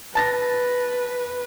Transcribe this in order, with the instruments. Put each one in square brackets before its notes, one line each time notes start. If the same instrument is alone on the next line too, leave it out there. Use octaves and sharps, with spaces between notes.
[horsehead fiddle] B4 [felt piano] A5 A6 A#6